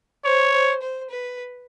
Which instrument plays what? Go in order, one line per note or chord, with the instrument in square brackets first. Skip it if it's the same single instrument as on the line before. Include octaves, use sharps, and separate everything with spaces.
[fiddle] C5 [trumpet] C#5
[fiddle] C5
C5
B4